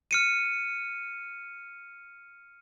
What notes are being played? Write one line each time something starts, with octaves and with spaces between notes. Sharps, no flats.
F6 C#7 D#7